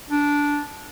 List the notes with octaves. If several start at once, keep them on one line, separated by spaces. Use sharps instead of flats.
D4